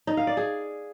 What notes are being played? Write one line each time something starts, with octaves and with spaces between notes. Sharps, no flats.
D#4
F5
D5
G#4